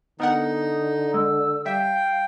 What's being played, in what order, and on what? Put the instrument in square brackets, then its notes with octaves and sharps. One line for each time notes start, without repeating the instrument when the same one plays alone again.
[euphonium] D3 [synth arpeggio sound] B3 A#4 F#5 [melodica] D#4
[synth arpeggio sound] G#3 [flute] E6
[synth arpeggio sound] G3 E5 [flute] F5 [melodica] G5